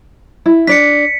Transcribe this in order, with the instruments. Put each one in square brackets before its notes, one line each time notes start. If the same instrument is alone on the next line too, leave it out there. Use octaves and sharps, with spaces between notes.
[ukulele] E4
[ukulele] D4 D5 [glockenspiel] B6 C#7